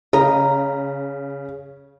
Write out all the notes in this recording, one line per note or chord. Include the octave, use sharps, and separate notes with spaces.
C#3 D#5 A#5